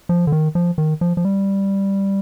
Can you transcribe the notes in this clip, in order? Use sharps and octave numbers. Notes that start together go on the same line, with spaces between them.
F3
D3
D#3
F3
D#3
F3
F3
G3